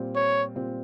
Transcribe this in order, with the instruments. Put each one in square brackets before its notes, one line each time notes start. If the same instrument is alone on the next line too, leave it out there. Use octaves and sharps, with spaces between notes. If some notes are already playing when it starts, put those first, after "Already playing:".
Already playing: [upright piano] A#2 G3 C4
[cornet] C#5
[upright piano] A#2 G3 C4